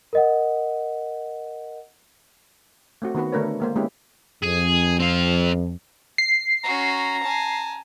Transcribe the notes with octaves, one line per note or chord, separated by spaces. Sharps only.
A#4 D#5 F#5
A3 C4 F#4
D#3 B3 F#4 B4
D3 A3 D4 A#4 B4 C#5
G#3 A#3 C5
G#3 A#3 B3 C#4 E4 G4
F2 G#4
C4 F5
C7
C#4 F#4 A#5
G#5 A5